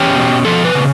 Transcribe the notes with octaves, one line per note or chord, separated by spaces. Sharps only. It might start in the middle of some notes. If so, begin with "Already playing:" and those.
Already playing: E2 C#4 G4
B2
F3 A4
B4
C#3